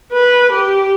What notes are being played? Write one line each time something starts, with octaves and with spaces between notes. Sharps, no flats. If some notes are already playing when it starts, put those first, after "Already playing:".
B4
G4